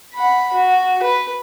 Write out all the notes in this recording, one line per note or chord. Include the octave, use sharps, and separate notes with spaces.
F#5 B5
F#4
B4